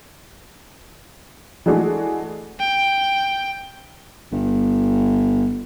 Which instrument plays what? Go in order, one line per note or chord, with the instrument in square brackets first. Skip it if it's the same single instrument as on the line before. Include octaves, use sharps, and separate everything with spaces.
[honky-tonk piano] E3 G#3 A3 D4 F#4 G#4
[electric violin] G5
[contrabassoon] G1